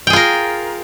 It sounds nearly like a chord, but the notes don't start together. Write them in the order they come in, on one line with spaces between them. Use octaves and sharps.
G5 G#4 F4 A#4